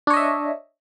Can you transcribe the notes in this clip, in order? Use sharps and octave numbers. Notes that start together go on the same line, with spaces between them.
D4 C#5 D#5 E5